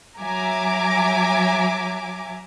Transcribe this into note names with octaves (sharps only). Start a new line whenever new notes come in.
F#3 E5 G#5 A#5 D6